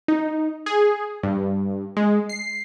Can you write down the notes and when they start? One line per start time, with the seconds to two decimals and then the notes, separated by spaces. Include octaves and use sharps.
0.08 D#4
0.66 G#4
1.23 G2
1.97 G#3
2.29 C7